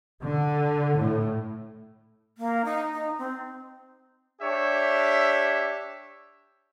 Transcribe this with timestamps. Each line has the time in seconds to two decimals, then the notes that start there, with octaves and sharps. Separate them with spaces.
0.24 D3
0.98 A2
2.38 A#3
2.65 D#4
2.93 D#4
3.18 C4
4.41 D4 G4 C#5 E5